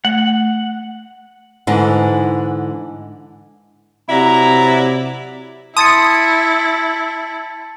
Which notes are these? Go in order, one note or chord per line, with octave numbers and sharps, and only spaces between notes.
A3 F#5
G#2 D3 E3
C3 F#3 E4 D5 A#5
E4 A5 C6 D#6 G#6 A6 C#7